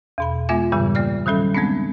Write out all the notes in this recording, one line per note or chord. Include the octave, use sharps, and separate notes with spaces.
E2 B2 B5
G#3 B3 F4 E5 G#5
G2 A#2 C#3 E3 G3
A#3 D5 F6
D#3 F#3 G3 C#4 A4
G#3 B3 C4 D4